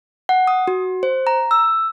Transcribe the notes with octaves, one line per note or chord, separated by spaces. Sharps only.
F#5
D#6
F#4
C5
A#5
E6